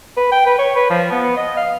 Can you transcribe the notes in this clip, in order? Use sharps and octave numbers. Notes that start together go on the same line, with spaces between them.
B4
G5
B4
C#5
B4
F3
B3
D#5
F5